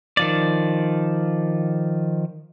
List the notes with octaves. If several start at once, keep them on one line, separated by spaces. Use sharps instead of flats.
D#3 F3 D5